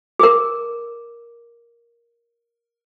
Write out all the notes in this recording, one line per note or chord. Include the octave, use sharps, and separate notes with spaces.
G#4 A#4